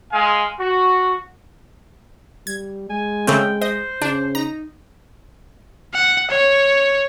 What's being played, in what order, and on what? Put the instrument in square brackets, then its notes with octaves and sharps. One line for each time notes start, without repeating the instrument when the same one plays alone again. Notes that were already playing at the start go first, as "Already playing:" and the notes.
[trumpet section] G#3 F5 G#5
F#4
[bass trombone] G3 [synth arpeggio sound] G#6
[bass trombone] G#3 [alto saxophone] G#5
[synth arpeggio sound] C#3 A3 C4 [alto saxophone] G5
[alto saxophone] C5 [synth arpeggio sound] D#5
[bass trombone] C#3 [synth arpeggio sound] D4
[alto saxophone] D#4 [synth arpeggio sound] A#5
[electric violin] F#5
C#5